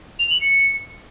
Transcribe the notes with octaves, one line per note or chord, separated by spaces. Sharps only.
F7
F#7
C#7